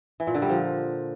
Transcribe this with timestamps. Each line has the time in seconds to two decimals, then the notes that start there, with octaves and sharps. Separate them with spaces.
0.20 E3
0.27 A#2
0.35 D3
0.42 G3
0.49 F3